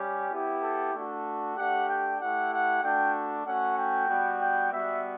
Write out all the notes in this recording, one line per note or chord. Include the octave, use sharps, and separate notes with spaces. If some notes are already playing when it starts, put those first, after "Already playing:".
Already playing: G3 C#4 G4
B3 E4 G4
A4
A3 D4 F#4
A3 D4 G4 F#5
G5
A3 E4 G4 F#5
F#5
A3 D4 F#4 G5
A3 C#4 F#4 F#5
G5
G3 B3 F#4
G5
G3 B3 F#4 E5